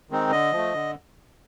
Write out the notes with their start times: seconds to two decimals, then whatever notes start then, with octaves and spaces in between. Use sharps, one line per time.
0.10 D#3 G#3 C4 D#4
0.31 D3 D#5
0.53 F3 A3
0.74 D3